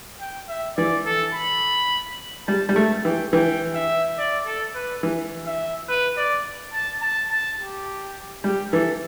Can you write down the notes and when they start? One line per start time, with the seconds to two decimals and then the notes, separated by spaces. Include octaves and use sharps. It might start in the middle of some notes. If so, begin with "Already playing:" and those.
0.20 G5
0.49 E5
0.77 E3 D5
1.06 A4
1.34 B5
2.48 G3 A5
2.69 G3
2.76 A3 A5
3.05 E3 G5
3.33 E3 G5
3.75 E5
4.18 D5
4.46 A4
4.75 B4
5.03 E3
5.46 E5
5.88 B4
6.17 D5
6.73 A5
7.02 A5
7.31 A5
7.59 G4
8.44 G3 G4
8.72 E3 A4